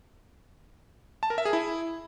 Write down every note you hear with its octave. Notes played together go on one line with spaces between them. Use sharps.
A5
A#4
E5
G#4
E4